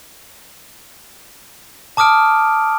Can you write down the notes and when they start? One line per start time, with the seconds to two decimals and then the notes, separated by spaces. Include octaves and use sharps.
1.97 A5 D6 D#6 F6 D7